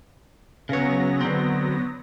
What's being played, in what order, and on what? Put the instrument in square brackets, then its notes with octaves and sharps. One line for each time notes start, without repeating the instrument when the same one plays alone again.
[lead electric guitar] C#3 C#5 [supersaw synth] F#3 B3 A#6
[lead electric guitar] D3 C4